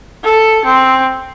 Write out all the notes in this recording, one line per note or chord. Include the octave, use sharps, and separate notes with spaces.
A4
C4